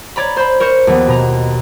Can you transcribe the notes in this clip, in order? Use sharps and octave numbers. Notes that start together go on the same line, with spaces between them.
C#5 D5 A#5 B5
C5 B5
A#4 C5 C#6 C#7
D#2 F3 B3
B2 A#5